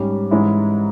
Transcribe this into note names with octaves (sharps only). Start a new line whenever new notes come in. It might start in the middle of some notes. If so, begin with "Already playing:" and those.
Already playing: G#2 G3 C#4 G4
G#2 E3 G#3 C#4 E4